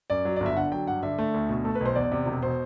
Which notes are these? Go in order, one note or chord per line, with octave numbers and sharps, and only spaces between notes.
F#2 D5
F#3
G1 D5
E5
D3 F#5
F#3 G5
G2 F#5
D3 E5
A3
D2
B2
A3 A4
B4
B1
C5
E2 D5
C3
E1
B2 C5